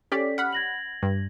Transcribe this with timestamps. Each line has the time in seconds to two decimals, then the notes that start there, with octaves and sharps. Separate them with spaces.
0.12 C#4 G4 A4 D5 B6
0.38 F#5 B5 F6
0.53 G#6 A#6 F#7
1.03 G2